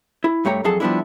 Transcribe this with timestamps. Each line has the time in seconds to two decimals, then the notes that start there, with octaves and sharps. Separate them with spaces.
0.24 E4
0.45 G2 A3 G4 C#5 A#5
0.64 F2 F#3 G#4 A4 A5
0.80 F3 G3 G#3 B3 D4 E4